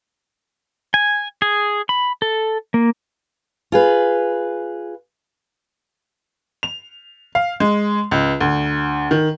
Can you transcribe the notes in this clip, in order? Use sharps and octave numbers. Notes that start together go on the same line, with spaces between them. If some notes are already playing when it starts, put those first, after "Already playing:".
G#5
G#4
B5
A4
A#3
F4 G#4 B4
F7
F5
G#3
C#2
D2
D#3